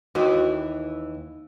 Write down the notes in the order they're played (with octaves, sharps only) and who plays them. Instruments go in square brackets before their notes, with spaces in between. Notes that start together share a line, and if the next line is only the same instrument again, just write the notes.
[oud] D#2 E3 [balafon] F#4